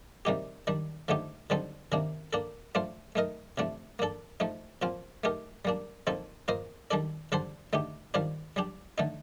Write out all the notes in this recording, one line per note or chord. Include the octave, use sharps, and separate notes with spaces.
C3 G3 A#3 D#4 G4
D#3 G3 D4
D3 F3 A3 D#4 G4
D3 G3 C4 D#4 A4
C3 D#3 A#3 D4
A#3 D4 A4
A3 D4 F4 C5
A3 D#4 A#4 D#5
C3 F3 A3 D4
A#3 D4 A4
F3 A3 D#4
A#2 F3 C4 F4
A3 D#4 G4 A#4
G3 A#3 D4
A#2 F3 C4 D#4 A4
A#3 F4 C5 D#5
D#3 G3 D4 A4 D5
D3 G3 D4 A4 C5
D3 A3 D#4 G4
D#3 G3 D4 F4 C5
G3 D4 G4
D3 A3 D#4